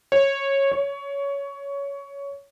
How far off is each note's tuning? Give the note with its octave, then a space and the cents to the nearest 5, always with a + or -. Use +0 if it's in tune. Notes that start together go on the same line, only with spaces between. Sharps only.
C#5 -15
C#5 +15